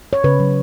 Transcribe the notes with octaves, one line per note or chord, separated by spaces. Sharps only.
C#5
C#3 B4
F#3